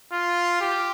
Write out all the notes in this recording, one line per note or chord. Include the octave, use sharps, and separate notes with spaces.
F4
G4